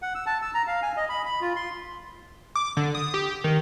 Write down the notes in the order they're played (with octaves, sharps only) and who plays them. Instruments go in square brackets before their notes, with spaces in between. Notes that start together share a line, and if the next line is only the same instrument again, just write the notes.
[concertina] F#5
E6
A5
E6
A#5
F5
G#5
D#5
B5
B5
F4
C6
[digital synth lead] D6
D3
D#6
G4
D#3